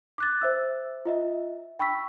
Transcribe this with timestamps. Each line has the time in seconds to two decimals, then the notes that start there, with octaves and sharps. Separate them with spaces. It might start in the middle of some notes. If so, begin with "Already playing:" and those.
0.18 D6 F#6 A6
0.41 C5 E5 E6
1.05 F4 D#5 E5
1.79 G5 B5 C#6 E6 B6